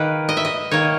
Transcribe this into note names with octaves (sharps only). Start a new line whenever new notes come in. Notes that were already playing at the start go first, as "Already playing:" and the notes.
Already playing: D#3 A#3 B4
D#5
E5
D#5
D#3 A#3 C#5